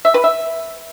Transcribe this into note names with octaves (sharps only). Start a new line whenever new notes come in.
E5
B4
E5